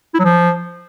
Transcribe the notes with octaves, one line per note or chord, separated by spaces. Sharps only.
E4
F#3
F3